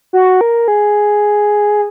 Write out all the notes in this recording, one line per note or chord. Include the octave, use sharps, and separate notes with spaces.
F#4
A#4
G#4